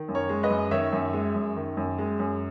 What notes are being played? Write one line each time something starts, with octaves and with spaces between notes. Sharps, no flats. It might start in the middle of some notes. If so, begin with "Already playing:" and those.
Already playing: D#3
F#2
A#4 C#5
G#3
B4 D#5
F#2
D#3 C#5 E5
F#2
G#3
F#2
D#3
F#2
G#3
F#2